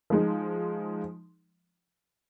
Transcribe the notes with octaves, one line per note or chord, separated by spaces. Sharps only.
F3 G#3 D#4